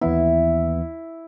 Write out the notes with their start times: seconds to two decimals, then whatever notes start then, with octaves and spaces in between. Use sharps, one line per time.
0.01 D#2 E3 B3 E4